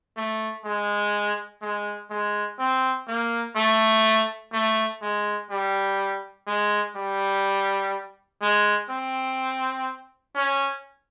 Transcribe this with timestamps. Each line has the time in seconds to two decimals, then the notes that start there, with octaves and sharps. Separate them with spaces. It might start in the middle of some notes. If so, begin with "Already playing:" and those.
0.17 A3
0.65 G#3
1.62 G#3
2.11 G#3
2.59 C4
3.08 A#3
3.56 A3
4.53 A3
5.02 G#3
5.50 G3
6.47 G#3
6.96 G3
8.42 G#3
8.90 C4
10.36 C#4